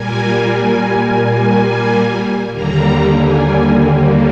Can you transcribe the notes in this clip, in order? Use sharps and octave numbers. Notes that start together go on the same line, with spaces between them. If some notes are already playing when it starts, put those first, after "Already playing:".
Already playing: A#2 G3 A#3 G#5
G#5
D#2 D3 G3 A#3 A#5
G#5